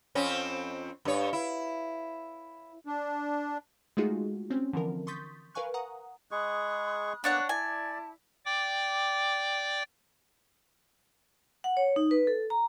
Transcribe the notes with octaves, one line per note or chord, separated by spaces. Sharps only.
F2 C4 C#4
G2 C#5
E4
D4
G#3 A3 D#4 F4 F#4 G#4
C4 C#4
D3 E3 F3 A#4
C6 C#6 D#6 G6 A6 B6
A#4 B4 F5 G#5 C#6 F#6
F#5 A#5 D#6
G#3 G#4 B5 C#6 D#6 F#6
A#3 B3 D4 C#5 D5 F#5
E4 D5 G#5 A5 D6
D5 G5 D6
F#5
C#5
D#4
B4
A4
A#5